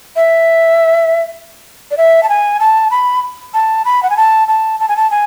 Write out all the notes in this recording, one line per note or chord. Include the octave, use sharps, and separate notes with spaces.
E5
D5
E5
A5
G#5
A5
B5
A5
B5
F#5
G#5
A5
A5
A5
G#5
A5
G#5